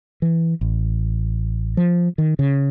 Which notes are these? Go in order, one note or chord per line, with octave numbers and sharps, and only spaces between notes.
E3
A1
F3
D#3
C#3